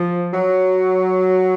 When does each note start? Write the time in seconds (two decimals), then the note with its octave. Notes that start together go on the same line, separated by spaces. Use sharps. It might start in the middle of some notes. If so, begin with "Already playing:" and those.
Already playing: F3
0.33 F#3